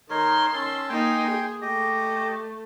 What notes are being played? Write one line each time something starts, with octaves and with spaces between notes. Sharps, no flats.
D#3 D#4 A#4 C#5 C6
C#4 A5 E6
A#3 D#4 G5 G#5 C6
G#4
A3 G4 D#5